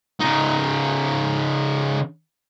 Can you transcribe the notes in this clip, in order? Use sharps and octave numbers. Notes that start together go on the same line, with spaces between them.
C#3 D#4